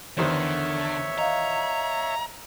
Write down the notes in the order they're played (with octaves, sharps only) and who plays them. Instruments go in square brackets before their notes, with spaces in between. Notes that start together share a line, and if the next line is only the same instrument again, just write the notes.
[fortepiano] E2 D#3 C5 [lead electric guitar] D3 [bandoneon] C#5 E5
[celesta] D#5 F5 [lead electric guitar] A#5